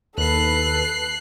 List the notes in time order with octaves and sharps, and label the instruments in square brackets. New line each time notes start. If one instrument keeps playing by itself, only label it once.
[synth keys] D#2 [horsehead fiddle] A4 B4 [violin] F#6 C7